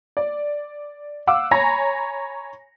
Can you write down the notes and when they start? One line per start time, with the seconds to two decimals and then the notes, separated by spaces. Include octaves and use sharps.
0.17 D5
1.27 F5 F#5 D6 E6
1.51 C#5 G#5 A#5 B5 A#6